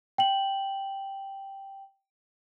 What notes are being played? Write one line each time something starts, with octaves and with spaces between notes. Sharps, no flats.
G5 F#7